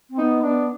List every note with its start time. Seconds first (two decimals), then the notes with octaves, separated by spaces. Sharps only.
0.09 C4
0.18 B3 D#4
0.43 B3 D4